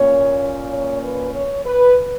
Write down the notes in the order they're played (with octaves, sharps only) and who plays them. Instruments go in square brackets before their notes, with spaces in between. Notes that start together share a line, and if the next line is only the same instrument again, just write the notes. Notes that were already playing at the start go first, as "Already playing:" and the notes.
Already playing: [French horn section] A#2 A#3 C#4 C#5
C#5
B4
C#5
B4